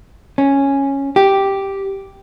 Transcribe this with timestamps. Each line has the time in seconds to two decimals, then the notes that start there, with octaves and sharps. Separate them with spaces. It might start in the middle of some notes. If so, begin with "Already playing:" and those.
0.38 C#4
1.16 G4